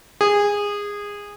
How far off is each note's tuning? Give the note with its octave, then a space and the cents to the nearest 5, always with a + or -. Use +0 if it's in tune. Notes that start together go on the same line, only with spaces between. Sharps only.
G#4 -20